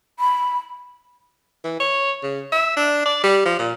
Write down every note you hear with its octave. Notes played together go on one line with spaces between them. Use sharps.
B5
E3
C#5
C#3
E5
D4
D5
G3
F3
A#2